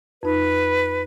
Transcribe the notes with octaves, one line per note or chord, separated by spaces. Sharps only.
F2 D#4 B4